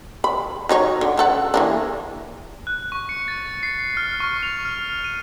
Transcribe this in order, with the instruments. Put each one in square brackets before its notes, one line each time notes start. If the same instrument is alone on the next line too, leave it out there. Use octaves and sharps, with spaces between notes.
[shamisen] B5
F#3 D#4 C#5
D3
C#3 A4 F#5
E3 A#3 D4
[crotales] F#6
C#6
C#7
A6
C7
F6
C#6
F7
F6
D#7